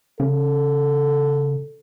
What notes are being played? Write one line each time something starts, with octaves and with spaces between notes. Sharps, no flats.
C#3 A4